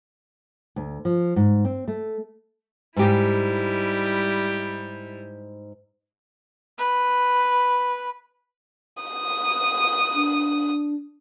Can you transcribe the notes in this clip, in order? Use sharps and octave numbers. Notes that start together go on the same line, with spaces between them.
D2
F3
G#2
C4
A3
G#2 G3 E4 G4
B4
D#6
D4